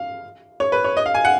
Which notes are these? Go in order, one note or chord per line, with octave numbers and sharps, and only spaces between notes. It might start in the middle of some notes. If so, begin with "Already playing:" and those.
Already playing: F5
C#5
B4
C#5
D#5
F5
G#5
F#5